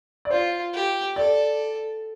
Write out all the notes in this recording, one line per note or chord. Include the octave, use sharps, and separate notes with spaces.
D5
F4 C5
G4
A4 D5